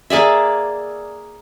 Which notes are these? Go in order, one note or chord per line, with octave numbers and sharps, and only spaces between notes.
A#3 G#4 D5 E5